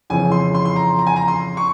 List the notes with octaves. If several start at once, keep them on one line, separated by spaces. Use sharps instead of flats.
F2 C#3 E3 G#5
C6
C6
C6
A#5
A#5
G#5
A#5
C6
C#6